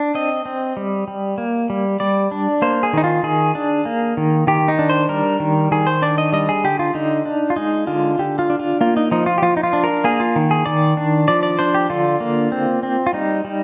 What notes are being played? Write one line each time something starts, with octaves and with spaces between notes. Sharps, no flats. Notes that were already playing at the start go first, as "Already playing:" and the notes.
Already playing: D4
C4 D#5
C4
G3
G3
A#3
G3
G3 D5
D4
A#3 C5
G#4
D#3 D#4
F4
D#3 G#4
D4
A#3
D#3
D#3 G4
D#4
D4
C5
G3 A#4
D#3
D#3 G#4
C5
D4 D5
D#5
G3 D#5
G#4
D3 G4
F4
D3 D#4
D4
F4
G#3 D#4
D3 F4
D3 G4
F4
D4
F4
A#3 F4
D#4
F3 D#4
F4
G4
F3 F4
D#4
F4
D4
A#4
A#3 G#4
F4
D#3
G#4
D#3 D5
D4
F3 D5
D5
D4 C5
G4
D3 F4
A#3
C4
C4
F4
G3 D#4
G3